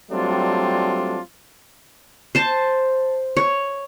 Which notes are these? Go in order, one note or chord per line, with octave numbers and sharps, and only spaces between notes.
F#3 G3 A3 C4 D4 F4
C5 A5
C#5